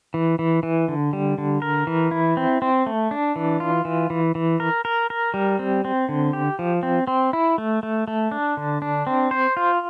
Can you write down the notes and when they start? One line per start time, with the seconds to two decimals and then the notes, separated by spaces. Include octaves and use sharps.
0.14 E3
0.39 E3
0.63 E3
0.88 D3
1.13 G3
1.38 D3
1.62 A#4
1.87 E3
2.11 E4
2.37 C4
2.62 C4
2.86 A3
3.11 D4
3.36 E3
3.60 F4
3.85 E3
4.10 E3
4.35 E3
4.60 A#4
4.85 A#4
5.10 A#4
5.34 G3
5.59 C4
5.85 C4
6.09 D3
6.33 G4
6.59 F3
6.83 C4
7.07 C4
7.33 E4
7.58 A3
7.83 A3
8.08 A3
8.31 D4
8.57 D3
8.82 D4
9.07 C4
9.31 C5
9.57 F4